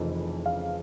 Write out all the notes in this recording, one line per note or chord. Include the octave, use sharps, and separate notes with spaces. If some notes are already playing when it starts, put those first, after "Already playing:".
Already playing: F1 F2 C#3 E3
F5